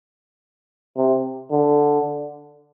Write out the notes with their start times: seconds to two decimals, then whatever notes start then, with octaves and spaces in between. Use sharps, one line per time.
0.97 C3
1.51 D3